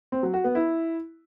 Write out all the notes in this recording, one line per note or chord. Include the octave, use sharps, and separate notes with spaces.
C4
F#3
F#4
B3
E4